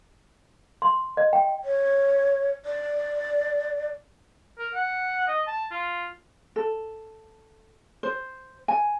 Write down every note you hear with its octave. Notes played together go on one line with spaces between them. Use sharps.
C6
D#5
G5
C#5
D5
A#4
F#5
D#5
A5
F4
A4
C5
G#5